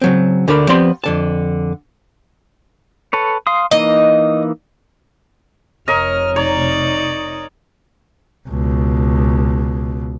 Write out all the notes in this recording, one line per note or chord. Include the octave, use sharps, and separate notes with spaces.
C#3 F#3 C4
D2 D3 D4 A#4 B5
F3 B3 C4 G4 D5 C6
F2 D3 A5
A4 B4 C#5
F5 C6 D#6
E3 A#3 D#4 D#5
F1 A#4 C#5 D#5 F6
D#4 C#5 D5 A#5
C#2 B2